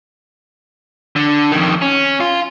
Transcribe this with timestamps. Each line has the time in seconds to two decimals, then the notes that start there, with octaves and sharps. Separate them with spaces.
1.16 D3
1.52 F2 D#3
1.82 C#4
2.20 F4